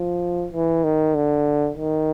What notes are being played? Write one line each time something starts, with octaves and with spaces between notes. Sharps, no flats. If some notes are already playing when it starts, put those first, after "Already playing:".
Already playing: F3
E3
D#3
D3
D#3